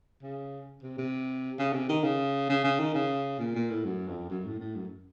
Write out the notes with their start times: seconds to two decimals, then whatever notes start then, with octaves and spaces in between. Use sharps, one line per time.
0.22 C#3
0.82 C3
0.98 C3
1.59 C#3
1.73 C3
1.89 D#3
2.03 C#3
2.49 C#3
2.64 C#3
2.79 D#3
2.94 C#3
3.39 A#2
3.55 A#2
3.70 A2
3.85 F#2
4.08 F2
4.30 F#2
4.46 A2
4.60 A2
4.76 F#2